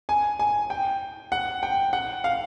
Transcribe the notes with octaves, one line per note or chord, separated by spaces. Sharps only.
G#5
G#5
G5
F#5
G5
F#5
F5